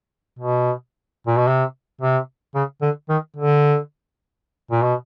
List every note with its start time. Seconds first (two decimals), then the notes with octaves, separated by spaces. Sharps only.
0.39 B2
1.27 A#2
1.38 B2
1.48 C3
2.01 C3
2.55 C#3
2.82 D3
3.09 D#3
3.36 D3
4.71 A#2
4.83 B2